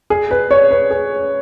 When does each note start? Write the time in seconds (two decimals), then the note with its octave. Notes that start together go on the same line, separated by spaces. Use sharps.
0.10 G#4
0.31 B4
0.51 C#5
0.71 B4
0.90 G#4